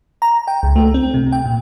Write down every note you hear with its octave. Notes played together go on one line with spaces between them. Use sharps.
A#5
G5
C#2
A3
C4
C3
G5
A#2